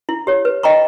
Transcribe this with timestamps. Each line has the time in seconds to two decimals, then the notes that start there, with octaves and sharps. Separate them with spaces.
0.09 E4
0.27 G4 C#5
0.45 B4
0.63 D#5 G5 A#5 C#6